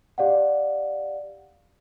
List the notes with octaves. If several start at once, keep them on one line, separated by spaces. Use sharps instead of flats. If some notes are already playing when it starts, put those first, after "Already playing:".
G4 D5 F5 F#5